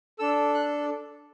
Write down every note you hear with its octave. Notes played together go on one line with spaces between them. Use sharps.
D4 A4 E6
F#6